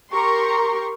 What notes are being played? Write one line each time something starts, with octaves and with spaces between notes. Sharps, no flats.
G4 A#4 A#5 C6 C#6